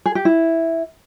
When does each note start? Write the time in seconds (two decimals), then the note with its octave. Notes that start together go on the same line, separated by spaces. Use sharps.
0.06 G#4
0.15 G4
0.25 E4